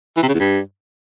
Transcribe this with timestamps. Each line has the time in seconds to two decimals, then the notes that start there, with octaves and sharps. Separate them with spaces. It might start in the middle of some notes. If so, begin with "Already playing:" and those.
0.17 E3
0.23 C3
0.28 C#3
0.34 E2
0.40 G2